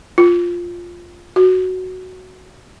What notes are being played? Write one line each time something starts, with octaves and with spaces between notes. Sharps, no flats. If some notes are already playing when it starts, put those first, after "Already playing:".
F4
F#4